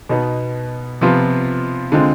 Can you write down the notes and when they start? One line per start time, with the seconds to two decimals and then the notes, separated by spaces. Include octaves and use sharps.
0.09 B2 B3 D#4
1.01 C3 F3 B3 F4
1.92 D3 G#3 C4 F4